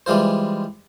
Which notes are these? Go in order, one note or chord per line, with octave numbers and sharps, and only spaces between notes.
E3 G3 G#3 F4 C5